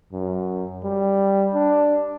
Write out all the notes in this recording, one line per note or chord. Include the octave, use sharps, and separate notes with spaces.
F#2
G3
D4